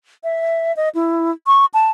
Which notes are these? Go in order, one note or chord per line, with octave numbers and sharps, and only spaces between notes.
E5
D#5
E4
C#6
A5